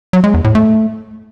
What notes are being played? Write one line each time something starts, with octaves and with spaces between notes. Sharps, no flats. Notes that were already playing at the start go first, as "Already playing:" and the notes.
F#3
G#3
E2
A2
A3